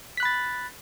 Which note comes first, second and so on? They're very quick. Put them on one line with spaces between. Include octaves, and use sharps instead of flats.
B6 F#6 B5 A6